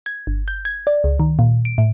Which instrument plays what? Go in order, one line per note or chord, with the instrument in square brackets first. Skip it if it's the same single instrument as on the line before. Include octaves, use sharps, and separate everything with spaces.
[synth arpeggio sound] G#6
G1
G6
G#6
D5
C#2
D#3
A#2
D7
A2